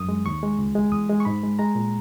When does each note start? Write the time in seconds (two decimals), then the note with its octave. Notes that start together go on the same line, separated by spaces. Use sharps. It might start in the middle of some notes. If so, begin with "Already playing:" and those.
Already playing: F#2 F#3 D#6
0.09 G#3
0.26 D#2 C#6
0.43 G#3
0.58 C#2
0.75 G#3
0.92 E2 D#6
1.09 G#3
1.20 C#6
1.25 G#2 B5
1.43 G#3
1.59 G#3 A#5
1.75 A#2